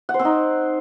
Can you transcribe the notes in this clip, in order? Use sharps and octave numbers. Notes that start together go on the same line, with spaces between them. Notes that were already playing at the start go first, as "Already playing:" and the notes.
F#5
C5
C4
D#4